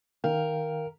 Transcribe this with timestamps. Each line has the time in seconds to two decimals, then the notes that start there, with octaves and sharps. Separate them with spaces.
0.24 D#3 A#4 F5 G5